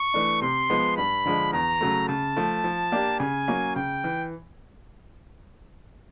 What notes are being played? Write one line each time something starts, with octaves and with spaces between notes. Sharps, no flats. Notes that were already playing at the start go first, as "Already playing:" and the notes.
Already playing: C#6
E3 A3 D4
C3 C6
F3 G#3 B3
G2 B5
D3 F3 G#3
E2 A#5
C#3 F#3 A3
C#3 A5
F3 A3
F3
A#3 D4 G4
C#3 G#5
F#3 A#3 C#4
C#3 G5
E3